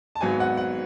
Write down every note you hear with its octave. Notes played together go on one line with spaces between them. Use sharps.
A5
G#1 G#2 F#3 B3 G#5
F#5
F#5